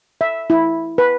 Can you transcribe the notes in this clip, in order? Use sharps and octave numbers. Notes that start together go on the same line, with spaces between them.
E5
E4
B4